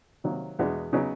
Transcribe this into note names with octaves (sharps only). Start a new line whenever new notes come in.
C3 D#3 F#3 A#3
E2 B2 G#3 B3 D4
C#3 F#3 B3 D#4